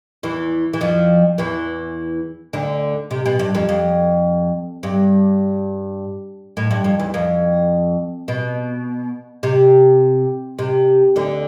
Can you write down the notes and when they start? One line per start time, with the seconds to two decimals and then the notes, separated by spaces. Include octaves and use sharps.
0.23 E2 E3
0.73 E3
0.81 F2 F3
1.38 E2 E3
2.53 D2 D3
3.11 C3
3.26 B2
3.39 G2
3.55 F2
3.69 F2
4.83 G2
6.57 A2
6.71 G2
6.84 F2
7.00 E2
7.14 F2
8.28 B2
9.43 C3
10.59 C3
11.16 D2 D3